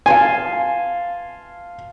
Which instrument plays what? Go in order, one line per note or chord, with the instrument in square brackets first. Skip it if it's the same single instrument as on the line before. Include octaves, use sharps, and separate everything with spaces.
[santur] F5 A5 C6 [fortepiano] G#5